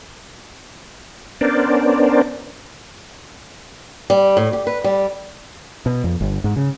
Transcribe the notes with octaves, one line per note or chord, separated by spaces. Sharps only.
B3 C#4 D4 A#4 C5 D5
G3
A2
G4
B4
G3
B2
F2
G1
G#2
C#3